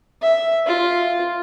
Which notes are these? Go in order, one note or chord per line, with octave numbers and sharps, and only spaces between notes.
E5
F4